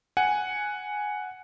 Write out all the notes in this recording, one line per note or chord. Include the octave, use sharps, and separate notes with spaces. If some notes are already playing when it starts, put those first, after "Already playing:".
F#5 G#5